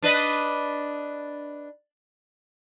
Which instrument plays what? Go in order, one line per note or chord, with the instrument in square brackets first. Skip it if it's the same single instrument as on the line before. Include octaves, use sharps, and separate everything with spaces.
[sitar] D4 B4 D#5